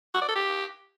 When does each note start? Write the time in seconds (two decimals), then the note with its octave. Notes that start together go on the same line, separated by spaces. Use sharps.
0.14 F#4
0.22 D5
0.29 A4
0.36 G4